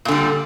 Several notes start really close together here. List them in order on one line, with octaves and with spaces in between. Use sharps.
A#2 D3 G3